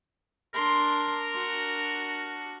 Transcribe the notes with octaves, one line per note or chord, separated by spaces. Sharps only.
D4 A#4 C6
D4 F#4